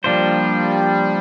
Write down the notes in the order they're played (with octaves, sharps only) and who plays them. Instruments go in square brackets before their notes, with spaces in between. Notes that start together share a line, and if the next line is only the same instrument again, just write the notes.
[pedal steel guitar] F3 A#3 D4 F4 C5 [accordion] G3